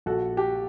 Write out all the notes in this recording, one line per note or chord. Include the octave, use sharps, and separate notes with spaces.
A#1 F#4 A4
G4